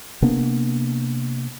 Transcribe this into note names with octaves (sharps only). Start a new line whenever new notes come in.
C3 A#3 B3 D4